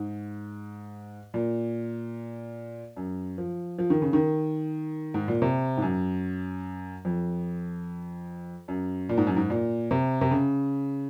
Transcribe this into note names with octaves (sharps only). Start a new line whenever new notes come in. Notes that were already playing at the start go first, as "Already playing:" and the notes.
Already playing: G#2
A#2
F#2
F3
F3
D#3
C#3
D#3
G#2
A#2
C3
G#2
F#2
F2
F#2
A#2
G#2
F#2
G#2
A#2
C3
C3
C#3